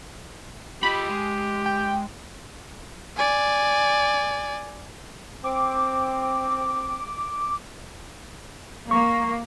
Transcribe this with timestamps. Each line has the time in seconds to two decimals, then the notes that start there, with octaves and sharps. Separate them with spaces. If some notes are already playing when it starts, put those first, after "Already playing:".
0.83 F4 G4 D#5 B5
1.09 G#3
1.66 G5
3.16 D5 G#5
5.44 C4 D6
8.91 A#3 C#6